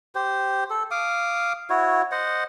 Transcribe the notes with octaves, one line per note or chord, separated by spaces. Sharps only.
G4 C5
A4
F5 D6 D#6
E4 F#4 C#5
C5 D#5 F#5